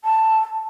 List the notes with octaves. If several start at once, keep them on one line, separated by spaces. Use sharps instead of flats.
A5